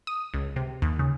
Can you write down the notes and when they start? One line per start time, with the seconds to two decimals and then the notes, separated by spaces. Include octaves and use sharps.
0.07 D#6
0.34 C#2
0.56 C3
0.82 D#2
0.99 C#3